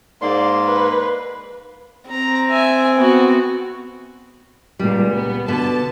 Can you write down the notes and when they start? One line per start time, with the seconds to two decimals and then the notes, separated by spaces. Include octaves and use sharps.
0.22 G#2 A#3 D5 C6
0.66 B4
2.10 C4 A#5
2.50 E5 G#5
2.95 B3 F#4
4.79 C#2 A#2 G3
5.11 B3
5.48 B2 D3 B3 A5